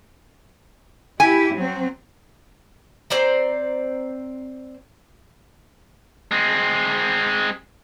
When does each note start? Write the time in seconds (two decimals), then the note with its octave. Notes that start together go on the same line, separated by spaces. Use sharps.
1.20 E4 G4 G#5
1.53 F#3 C4
3.10 C4 C5 D5 A#5
6.31 G#3 C4